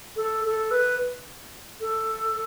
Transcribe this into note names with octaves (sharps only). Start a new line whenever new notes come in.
A4
A4
B4
A4